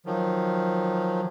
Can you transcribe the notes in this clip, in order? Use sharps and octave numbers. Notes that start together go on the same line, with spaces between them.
D#3 F3 F#3